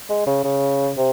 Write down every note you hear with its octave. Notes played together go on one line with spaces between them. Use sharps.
G#3
C#3
C#3
C3